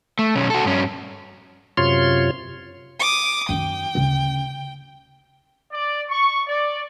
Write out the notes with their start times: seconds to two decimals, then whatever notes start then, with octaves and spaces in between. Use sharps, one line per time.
0.19 A3
0.35 B1 C#4
0.50 F#4 A4
0.65 G2 C#4
1.77 F#2 C3 F4 C#5 C6
3.00 D6 D#6
3.49 F#2 D#3 G5
3.95 D2 C#3
5.72 D5
6.09 C#6
6.47 D5